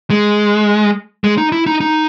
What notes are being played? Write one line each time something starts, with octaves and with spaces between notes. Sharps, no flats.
G#3
G#3
D#4
E4
D#4
D#4